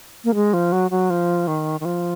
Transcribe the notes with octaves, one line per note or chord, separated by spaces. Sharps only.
A#3
G#3
F3
F#3
F#3
F3
D#3
D#3
F3